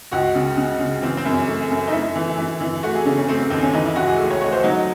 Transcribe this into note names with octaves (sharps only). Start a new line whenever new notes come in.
C#2 F#4
C#3
C#3
C#3
E3 C4
C4
F#2
C#4
A3
F#2
D#4
A3 E4
E3
E3
E3
A3 F#4
G#4
C#3 C#4
C#4
A3 C4
C4
D#2 C4
C#4
E3 D#4
E4
C#2 F#4
G#4
A3
C#5
A3 C#5
C5
F#3 D#4